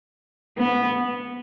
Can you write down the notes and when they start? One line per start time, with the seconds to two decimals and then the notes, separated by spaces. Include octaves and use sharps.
0.58 B3